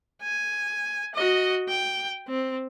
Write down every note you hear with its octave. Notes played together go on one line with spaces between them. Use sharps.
G#5
F#4 D#5
G5
C4